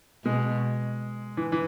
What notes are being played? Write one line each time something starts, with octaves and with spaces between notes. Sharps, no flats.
B2 G#3
E3
E3